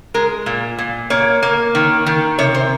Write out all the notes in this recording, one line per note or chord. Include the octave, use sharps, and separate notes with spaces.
G#3 A#4
A#2
A#2
A#3 C#5
A#3
D#3
D#3
C3 C#5
C5